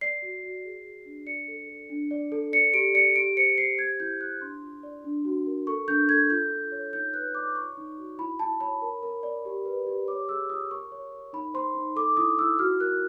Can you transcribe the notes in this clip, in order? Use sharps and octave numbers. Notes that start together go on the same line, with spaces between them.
D5 C7
F#4
F#4
G#4
G#4
D4
D5 C#7
A4
A4
D4
D5
A4
D5 C#7
G4 D7
D5 C#7
G4 D7
C5 C#7
C5 C7
G4 G#6
E4 G6
G4 F#6
D4 C6
F4
D5
D4
F#4
A#4
A4 C#6
D4 G6
A4 G#6
F4 G6
F4
C#5
D#4 G6
B4 F#6
D5 D6
C#5 C#6
D#4
F#4
E4 B5
E4 A5
C#5 B5
A#4
A#4
D5
G4
B4
G4
C#5 D6
G#4 E6
F4 D#6
A#4 C#6
C#5
A#4
D#4 B5
C5 C6
D#4
A4 D6
E4 D#6
E4 E6
F#4 F6
A#4 F#6